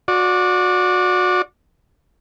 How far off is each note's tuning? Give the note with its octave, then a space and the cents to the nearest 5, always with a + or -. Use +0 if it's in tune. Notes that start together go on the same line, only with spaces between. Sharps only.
F#4 -30 D5 +0